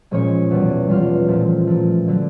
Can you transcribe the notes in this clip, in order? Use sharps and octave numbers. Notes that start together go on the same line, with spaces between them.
A#2 F3 G#3 C#4 C#5
E2 B2 G3
E2 B2 G3 F4 F5
A#2 F3 A3
A#2 F3 A3
D3 F#3 A3